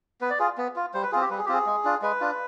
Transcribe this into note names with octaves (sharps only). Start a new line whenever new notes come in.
B3 B4
D5
F4 G#4
B3
F4
G3 C5
B4
C4 F4 G#4
G4
G3 B4
G#4
G4
C4 F4 G#4
G#3
D4 F4
G#3 B4
D4 F4